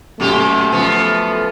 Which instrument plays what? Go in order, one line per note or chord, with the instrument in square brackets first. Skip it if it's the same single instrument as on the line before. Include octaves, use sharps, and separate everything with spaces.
[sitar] F#2 A#2 G4 [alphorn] A3
[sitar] F#2 F3 B3